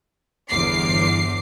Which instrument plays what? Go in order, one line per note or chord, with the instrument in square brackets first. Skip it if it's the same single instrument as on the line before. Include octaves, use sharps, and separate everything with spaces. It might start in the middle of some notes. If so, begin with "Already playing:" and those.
[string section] G1 E2 D6 C7